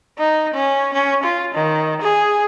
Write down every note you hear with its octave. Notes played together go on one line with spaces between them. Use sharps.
D#4
C#4
C#4
F4
D#3
G#4